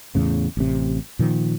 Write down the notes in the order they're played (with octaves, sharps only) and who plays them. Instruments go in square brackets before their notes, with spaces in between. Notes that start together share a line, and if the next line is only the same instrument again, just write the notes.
[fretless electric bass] E2 A2 C#3
A1 C3
A#2 D#3 F3